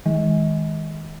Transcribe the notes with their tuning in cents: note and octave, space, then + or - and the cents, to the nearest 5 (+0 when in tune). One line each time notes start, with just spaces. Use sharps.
D#3 +35 G#3 +0